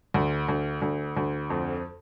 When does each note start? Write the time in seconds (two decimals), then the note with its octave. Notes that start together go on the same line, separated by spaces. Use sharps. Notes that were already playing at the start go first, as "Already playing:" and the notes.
0.14 D2
0.49 D2
0.82 D2
1.17 D2
1.50 F2